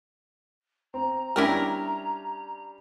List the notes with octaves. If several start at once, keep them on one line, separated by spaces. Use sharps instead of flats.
C4 A#5
G3 C#4 D4 E4 G4 A#4